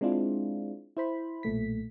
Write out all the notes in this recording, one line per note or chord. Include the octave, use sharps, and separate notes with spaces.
G#3 C4 D4 E4 F4
E4 C5 B5
B1 A#2 A3 B6